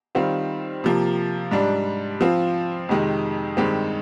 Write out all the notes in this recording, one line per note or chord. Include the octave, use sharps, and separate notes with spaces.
D#3 G3 C4 F4
C3 F3 A#3
G#2 G3 D4
F3 C4 F4
F2 C3 D#3 G#3
G2 D#3 G#3 C4 G4